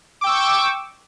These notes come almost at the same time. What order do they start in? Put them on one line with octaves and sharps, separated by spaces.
D6 G5 E6 C#6